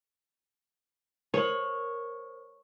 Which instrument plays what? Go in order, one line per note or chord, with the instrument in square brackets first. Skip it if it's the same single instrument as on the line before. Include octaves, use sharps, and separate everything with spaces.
[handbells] A#4 C5 [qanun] C#5